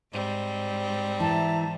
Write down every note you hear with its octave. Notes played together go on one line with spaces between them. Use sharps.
G#2 G3 C4
E3 E5 A5 A#5